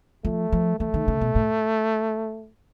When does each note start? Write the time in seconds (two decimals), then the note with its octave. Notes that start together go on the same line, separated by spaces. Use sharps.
0.25 F3 A3
0.52 F3
0.80 E3 A3
0.94 D#3
1.08 C#3
1.21 B2
1.35 A2